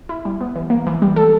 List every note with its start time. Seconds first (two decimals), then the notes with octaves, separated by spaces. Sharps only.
0.09 E4
0.25 G3
0.41 B3
0.56 E3
0.70 A#3
0.87 E3
1.02 G3
1.16 A4